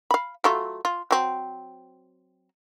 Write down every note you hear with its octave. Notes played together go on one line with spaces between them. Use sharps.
F5 B5
F#3 A3 F4
F4
F#3 C4